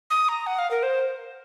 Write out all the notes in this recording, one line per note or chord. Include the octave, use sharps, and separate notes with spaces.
D#6
A#5
F#5
F5
A#4
C5